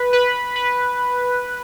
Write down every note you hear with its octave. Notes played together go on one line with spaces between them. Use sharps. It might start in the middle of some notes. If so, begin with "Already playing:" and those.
Already playing: B4
B4
B4